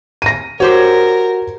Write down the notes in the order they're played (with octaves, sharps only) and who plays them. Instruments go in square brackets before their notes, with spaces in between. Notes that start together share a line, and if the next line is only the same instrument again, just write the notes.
[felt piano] A#6 D#7
[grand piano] F#4 [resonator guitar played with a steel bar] G4 C5 C#5 [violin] A#4